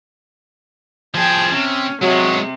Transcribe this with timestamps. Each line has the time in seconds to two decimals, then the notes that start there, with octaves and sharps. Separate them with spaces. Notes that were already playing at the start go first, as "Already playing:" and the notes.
1.14 F3 G#4 G5 A5 G#6
1.52 C3 C#4
2.02 C3 F#3 G#3 B3